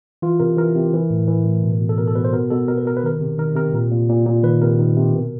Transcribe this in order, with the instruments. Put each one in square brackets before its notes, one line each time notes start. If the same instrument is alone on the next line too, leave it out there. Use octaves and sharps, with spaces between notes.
[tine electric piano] E3 F4
C3 A#4
E3 A#4
C3
E3
A2
E3
A2
B2
B2
A4
B2 A#4
A4
B2 B4
C5
B2 A#4
B2 A4
B2 A#4
B4
B2 A#4
B4
D#3 A#4
C3
D#3 A#4
C3 A#4
A#2
A#2
A#2
A#2
D#3 B4
C3 A#4
D#3
C3
B2